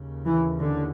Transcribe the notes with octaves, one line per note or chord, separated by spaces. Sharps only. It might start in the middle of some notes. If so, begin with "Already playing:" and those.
Already playing: D#2 C#3
E3
D3